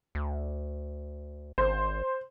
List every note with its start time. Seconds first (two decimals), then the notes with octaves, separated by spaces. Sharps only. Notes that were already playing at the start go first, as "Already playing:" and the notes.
0.15 D2
1.58 G#1 C5